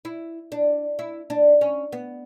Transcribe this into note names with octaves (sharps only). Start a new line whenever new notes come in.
E4
D4
E4
D4
C#4
B3